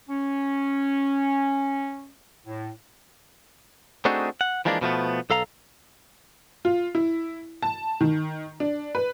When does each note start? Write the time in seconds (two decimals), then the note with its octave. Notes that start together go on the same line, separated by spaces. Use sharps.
0.09 C#4
2.47 A2
4.05 A3 C4 D4 D#4 F#4 G#4
4.41 F#5
4.65 E3 F3 G#3 A#3 D4
4.81 B2 F3 A3 B3
5.30 B1 A4 F5 A#5
6.65 F4
6.95 E4
7.63 A5
8.01 D#3
8.60 D4
8.95 B4